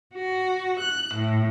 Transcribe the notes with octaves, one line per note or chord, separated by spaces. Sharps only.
F#4
F#6
A2